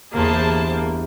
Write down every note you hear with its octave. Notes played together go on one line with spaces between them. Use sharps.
G1 E2 A#3 G#4 C5 A5